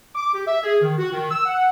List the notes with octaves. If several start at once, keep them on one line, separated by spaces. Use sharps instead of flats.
D6
G4
E5
G#4
D#3
F#4
D#3
E6
F#5